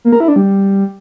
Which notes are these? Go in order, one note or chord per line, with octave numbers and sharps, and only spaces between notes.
A#3
A#4
E4
D4
G3